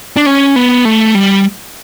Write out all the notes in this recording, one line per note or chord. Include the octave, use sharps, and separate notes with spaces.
D4
C#4
B3
A3
G3